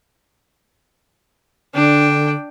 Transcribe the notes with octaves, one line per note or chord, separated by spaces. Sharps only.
D3 D4 G5